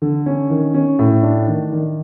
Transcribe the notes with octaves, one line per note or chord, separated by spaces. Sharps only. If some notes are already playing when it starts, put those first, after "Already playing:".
D3
C#4
D#3
C#4
A2
D4
D#3
D#3